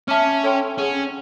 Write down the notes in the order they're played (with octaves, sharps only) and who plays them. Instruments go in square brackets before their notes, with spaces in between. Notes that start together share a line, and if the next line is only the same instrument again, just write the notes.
[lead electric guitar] C#4 [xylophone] E5 A5 D6 F6
[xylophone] A4 C#5 E5 G5 C6
[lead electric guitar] C#4 [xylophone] G#4 C#5 F#5